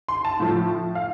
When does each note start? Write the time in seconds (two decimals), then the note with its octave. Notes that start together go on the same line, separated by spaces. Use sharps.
0.08 C6
0.25 A5
0.40 A2 F3
0.95 F5